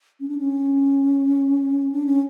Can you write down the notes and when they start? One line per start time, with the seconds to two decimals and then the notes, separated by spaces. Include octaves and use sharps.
0.20 C#4
0.28 D4
0.38 C#4
1.92 D4
2.06 C#4